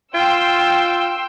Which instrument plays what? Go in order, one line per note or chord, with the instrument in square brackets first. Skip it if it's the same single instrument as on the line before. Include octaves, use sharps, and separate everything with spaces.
[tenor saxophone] F4 [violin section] G5 C6 E6